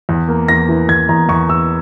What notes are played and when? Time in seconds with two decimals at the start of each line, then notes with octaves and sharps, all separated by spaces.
0.09 E2
0.28 A#3
0.48 E2 A#6
0.69 E3
0.89 E2 G#6
1.09 E2 A#5
1.29 E2 C#6
1.49 E2 E6